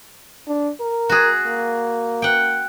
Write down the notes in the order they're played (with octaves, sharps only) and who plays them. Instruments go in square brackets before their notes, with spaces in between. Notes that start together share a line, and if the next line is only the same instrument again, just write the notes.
[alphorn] D4
A#4
[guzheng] F#4 G#4
[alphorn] A#3
[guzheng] F#5 G5